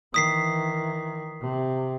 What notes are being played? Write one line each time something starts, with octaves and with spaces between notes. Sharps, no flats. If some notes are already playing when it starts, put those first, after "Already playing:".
D#3 E3 D#6 B6 C7
C3